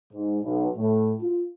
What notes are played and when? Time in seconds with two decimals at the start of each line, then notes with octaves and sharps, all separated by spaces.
0.14 G#2
0.44 B1
0.77 A2
1.22 F4